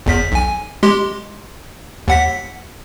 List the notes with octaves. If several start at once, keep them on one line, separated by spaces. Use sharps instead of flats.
G1 E2 B6
B1 G#5
G#3 G4 C6
D#2 F#5 B6